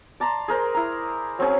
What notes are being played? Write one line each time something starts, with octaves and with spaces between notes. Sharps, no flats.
D5 A5 A#5 C6
G#4 A#4 C5
E4 A#5
F#3 C4 C#4 G#4